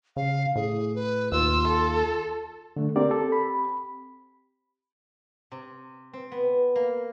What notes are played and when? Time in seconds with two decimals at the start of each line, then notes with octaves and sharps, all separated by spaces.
0.16 C#3 F5
0.56 A2 G#4
0.95 B4
1.32 D#2 F4 E6
1.67 A4
2.76 D3 A3
2.96 C4 G4 A#4 D5
3.11 A4
3.32 B5
5.52 C3
6.13 C4
6.32 B3
6.76 A#3